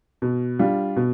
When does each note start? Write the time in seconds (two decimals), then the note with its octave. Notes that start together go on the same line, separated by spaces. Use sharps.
0.22 B2
0.59 G3 D4 F4
0.96 B2